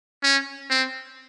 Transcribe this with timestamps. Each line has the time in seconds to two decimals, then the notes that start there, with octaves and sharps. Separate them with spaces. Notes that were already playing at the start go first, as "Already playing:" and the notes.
0.23 C#4
0.70 C4